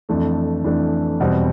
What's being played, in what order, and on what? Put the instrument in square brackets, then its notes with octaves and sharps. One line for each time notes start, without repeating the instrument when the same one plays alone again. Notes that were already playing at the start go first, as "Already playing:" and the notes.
[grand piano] F2 E3 A3 D4
F2 E3 A3 D4
E2 B2 G3 C4